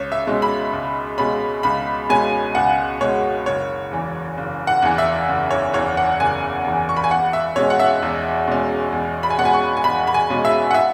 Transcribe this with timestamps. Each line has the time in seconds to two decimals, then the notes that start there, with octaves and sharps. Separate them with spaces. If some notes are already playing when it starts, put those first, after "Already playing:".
Already playing: C#2 C#5
0.12 E5
0.27 B2 G#3 C#4
0.42 B5
0.73 C#2
1.18 B2 G#3 C#4 B5
1.63 C#2 B5
2.09 B2 G#3 C#4 G#5
2.55 C#2 F#5
3.01 B2 G#3 C#4 C#5
3.46 F#1 C#5
3.91 E2 E3
4.38 F#1
4.67 F#5
4.82 E2 E3
4.98 E5
5.29 F#1
5.51 C#5
5.73 E2 E3 C#5
5.97 F#5
6.20 F#1 G#5
6.64 E2 E3
6.89 C#6
6.97 B5
7.04 G#5
7.10 E2 F#5
7.33 E5
7.56 B2 G#3 C#4 C#5
7.70 F#5
7.80 E5
8.02 E2
8.48 B2 G#3 C#4
8.92 E2
9.23 B5
9.30 G#5
9.38 B2 G#3 C#4 F#5
9.45 G#5
9.54 C#6
9.77 G#5
9.84 E2 B5
10.07 B5
10.14 G#5
10.30 B2 G#3 C#4
10.45 E5
10.71 F#5
10.74 E5